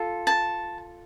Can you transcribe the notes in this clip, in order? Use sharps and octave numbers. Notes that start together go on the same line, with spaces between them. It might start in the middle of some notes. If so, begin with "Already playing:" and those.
Already playing: F4 A4
A5